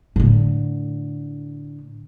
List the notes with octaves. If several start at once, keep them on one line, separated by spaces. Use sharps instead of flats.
A2 D3